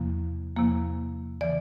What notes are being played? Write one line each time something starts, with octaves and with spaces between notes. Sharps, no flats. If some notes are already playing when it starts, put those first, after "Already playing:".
Already playing: E2 C3 F3 A#3
E2 C3 F3 A#3
C#3 E3 D5